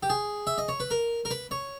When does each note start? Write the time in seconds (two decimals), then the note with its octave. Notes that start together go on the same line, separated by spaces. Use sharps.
0.03 G4
0.10 G#4
0.47 E5
0.58 D#5
0.68 C#5
0.80 B4
0.91 A#4
1.25 A#4
1.31 B4
1.51 C#5